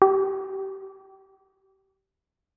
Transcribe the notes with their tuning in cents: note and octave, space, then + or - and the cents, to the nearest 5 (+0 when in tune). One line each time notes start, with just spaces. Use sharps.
G4 -25